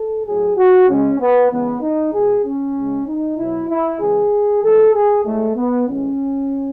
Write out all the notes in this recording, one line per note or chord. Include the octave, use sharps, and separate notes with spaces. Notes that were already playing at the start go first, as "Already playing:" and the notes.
Already playing: A4
A2 F#3 G#4
F#4
C#3 G#3 C#4
B3
C#3 E3 G#3 B3
D#4
B2 G#3 G#4
C#4
C#3 G#3
D#4
B2 F#3 E4
E4
C#3 E3 G#3 G#4
A2 E3 G#3 A4
G#4
A2 G#3 A3
B3
A2 E3 G#3 C#4